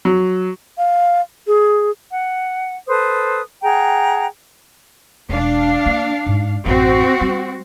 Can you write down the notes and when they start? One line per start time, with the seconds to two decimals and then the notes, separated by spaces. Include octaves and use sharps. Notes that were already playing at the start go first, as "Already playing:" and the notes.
0.05 F#3
0.78 F5
1.47 G#4
2.12 F#5
2.87 A4 B4 C5 D#6
3.62 G#4 F#5 G5 A#5
5.29 E1 D4 F5
5.86 A#3
6.26 G#2
6.66 A1 F#2 C4 F#4
7.21 G3